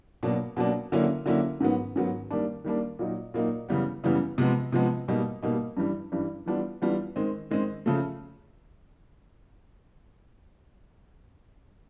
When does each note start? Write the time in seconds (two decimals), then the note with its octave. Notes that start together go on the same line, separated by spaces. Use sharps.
0.23 B2 F#3 A#3 D4
0.57 B2 F#3 A#3 D4
0.92 D3 F#3 A#3 C#4 E4
1.26 D3 F#3 A#3 C#4 E4
1.60 G#2 D#3 F#3 B3
1.96 G#2 D#3 F#3 B3
2.30 D#3 G3 A#3 D4
2.64 D#3 G3 A#3 D4
2.99 A#2 F#3 A#3 D#4
3.34 A#2 F#3 A#3 D#4
3.69 F#2 C#3 E3 G3 B3
4.04 F#2 C#3 E3 G3 B3
4.38 C3 F3 G#3 B3
4.72 C3 F3 G#3 B3
5.08 B2 G3 A#3 D#4
5.43 B2 G3 A#3 D#4
5.77 G2 E3 G3
6.12 G2 E3 G3
6.46 E3 G3 B3 D4 F4
6.82 E3 G3 B3 D4 F4
7.16 D#3 G#3 C4
7.51 D#3 G#3 C4
7.86 C#3 F3 A3